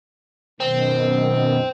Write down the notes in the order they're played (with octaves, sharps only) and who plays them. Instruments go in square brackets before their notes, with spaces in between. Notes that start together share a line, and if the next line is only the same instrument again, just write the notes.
[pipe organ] F#2 B2 D#3 [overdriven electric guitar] C4